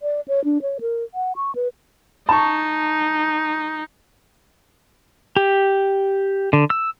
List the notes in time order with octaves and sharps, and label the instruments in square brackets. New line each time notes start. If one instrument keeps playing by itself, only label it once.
[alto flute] D5
C#5
D4
C#5
A#4
F#5
C#6
B4
[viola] D#4 [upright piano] A5 C#6
[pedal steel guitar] G4
D3
E6